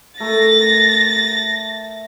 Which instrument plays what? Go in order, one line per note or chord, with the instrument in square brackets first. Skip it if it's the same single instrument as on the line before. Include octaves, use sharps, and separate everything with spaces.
[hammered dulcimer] A3 A#4 [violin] A6 A#6